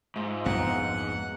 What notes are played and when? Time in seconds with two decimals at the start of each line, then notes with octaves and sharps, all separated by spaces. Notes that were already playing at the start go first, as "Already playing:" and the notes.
0.16 G#2 F4 E5
0.46 A#1 F2 B2 F#3 A#3 B3 F#5